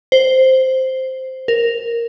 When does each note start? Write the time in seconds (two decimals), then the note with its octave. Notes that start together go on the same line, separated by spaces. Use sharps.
0.12 C5
1.48 A#4